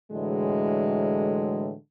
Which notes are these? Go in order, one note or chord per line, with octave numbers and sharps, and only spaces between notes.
A2 D3 E3 F#3 G#3